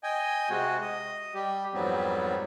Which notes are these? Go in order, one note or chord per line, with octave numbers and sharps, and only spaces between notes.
D#5 G5 G#5
C3 G#3 C4 F#4
D#5
G3 G4
F2 G#2 F#3 G3 B3 C4